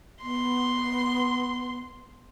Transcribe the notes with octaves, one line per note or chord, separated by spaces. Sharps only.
B3 C6